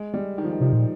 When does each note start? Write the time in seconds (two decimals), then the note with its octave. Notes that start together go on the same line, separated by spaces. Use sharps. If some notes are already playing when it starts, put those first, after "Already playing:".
Already playing: G#3
0.14 G3
0.38 D#3
0.44 F3
0.52 D#3
0.61 C3 F3
0.73 A#2